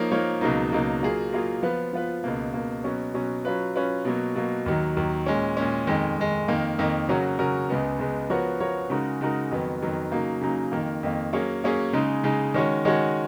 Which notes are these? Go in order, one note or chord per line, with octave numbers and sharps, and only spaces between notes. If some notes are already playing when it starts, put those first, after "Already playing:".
Already playing: F3 A#3 D#4 A#4 C#5
F3 A#3 D#4 A#4 C#5
C#2 B2 F#3 A#3 D#4
C#2 B2 F#3 A#3 D#4
F#3 A#3 F4 G#4
F#3 A#3 F4 G#4
F3 B3 F4 B4
F3 B3 F4 B4
C#2 B2 A#3
C#2 B2 A#3
B2 F#3 C#4
B2 F#3 C#4
F#3 C#4 F4 B4
F#3 C#4 F4 B4
B2 F#3 A#3
B2 F#3 A#3
D#2 D#3 F#3
D#2 D#3 F#3
A#2 G#3 C#4
A#2 G#3 C#4
F2 D#3 G#3
F2 D#3 G#3
F2 D#3 A#3
F2 D#3 A#3
C#3 F#3 C#4 F#4 A#4
C#3 F#3 C#4 F#4 A#4
C#2 C#3 G#3 B3
C#2 C#3 G#3 B3
F3 B3 F#4 A#4 C#5
F3 B3 F#4 A#4 C#5
C#3 G#3 D#4 F#4 A#4
C#3 G#3 D#4 F#4 A#4
F2 D#3 F#3 B3
F2 D#3 F#3 B3
C#3 F#3 A#3 D#4
C#3 F#3 A#3 D#4
F2 D#3 A#3
F2 D#3 A#3
F#3 A#3 C#4 G#4 C#5
F#3 A#3 C#4 G#4 C#5
C#3 G#3 D#4
C#3 G#3 D#4
D#3 G#3 C#4 F#4 C#5
D#3 G#3 C#4 F#4 C#5